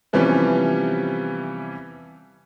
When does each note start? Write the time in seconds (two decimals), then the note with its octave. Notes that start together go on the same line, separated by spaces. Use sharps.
0.13 C3 E3 F3 G3 B3 C#4